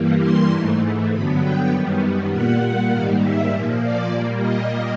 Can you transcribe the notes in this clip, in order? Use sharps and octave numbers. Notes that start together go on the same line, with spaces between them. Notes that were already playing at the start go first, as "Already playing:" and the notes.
Already playing: G2 E3 G3 A#3
C6
G#2 E3 A3
G2 D3 F#3 B3 B5
G5
F#2 D#3 G3 B3
A#2 G3 A#3 F#5
G#2 D#3 G3 A#3 F5
E5
A#2 F3 A#3
D5
A#2 G3 A#3
D#5